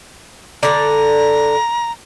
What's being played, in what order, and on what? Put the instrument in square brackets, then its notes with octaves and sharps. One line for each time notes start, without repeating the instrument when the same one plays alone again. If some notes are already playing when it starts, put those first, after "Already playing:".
[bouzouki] D3 D5 [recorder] A#5